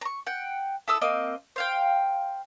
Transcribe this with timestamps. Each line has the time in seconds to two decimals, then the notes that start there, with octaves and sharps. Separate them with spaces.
0.01 A#5 C#6
0.27 F#5 G5
0.88 E4 A4 D#6 E6
1.02 A#3 C4 D#5
1.56 C5 F5 G5